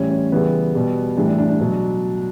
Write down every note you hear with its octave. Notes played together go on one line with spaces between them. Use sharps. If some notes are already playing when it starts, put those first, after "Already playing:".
Already playing: A2 E3 G3 C#4
C#4
C#3 E3 G3 B3
B2 G3
A2 E3 G3 D4
D4
D4
D4
B2 F#3